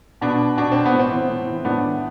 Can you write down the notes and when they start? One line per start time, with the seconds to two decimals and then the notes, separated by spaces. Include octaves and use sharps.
0.21 B2 B3 D4
0.57 B2 D4
0.72 C4
0.85 B3
0.94 A2
0.99 C4
1.12 E3
1.30 A2
1.47 E3
1.65 A2 B3 D4
1.82 E3